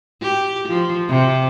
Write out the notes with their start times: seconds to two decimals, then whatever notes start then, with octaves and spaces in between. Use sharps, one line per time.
0.22 G4
0.68 F3
1.08 C3